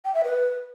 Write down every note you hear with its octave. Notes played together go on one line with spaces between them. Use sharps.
G5
E5
B4